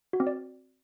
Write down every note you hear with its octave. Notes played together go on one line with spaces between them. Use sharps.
F#4
C4
D5